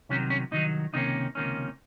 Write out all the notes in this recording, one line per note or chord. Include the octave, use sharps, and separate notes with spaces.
C2 C3 D#3 F#3 C#4
C#4
C2 C3 D#3 F#3 D#4
C#2 C3 D#3 A#3 C#4 D#4
C#2 C3 D#3 A#3 C#4